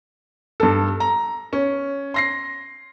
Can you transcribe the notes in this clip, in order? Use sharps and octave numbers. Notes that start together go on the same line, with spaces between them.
G2 A4
A#5
C#4
C6 A#6 C7